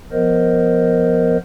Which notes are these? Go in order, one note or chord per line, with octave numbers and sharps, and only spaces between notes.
F3 B3 A#4 C5 D#5